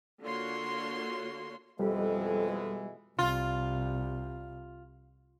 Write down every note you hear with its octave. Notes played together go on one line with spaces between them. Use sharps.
D3 A#3 F4 F#4 C#5 C6
F2 B2 E3 G3 G#3 G4 A4
C2 F4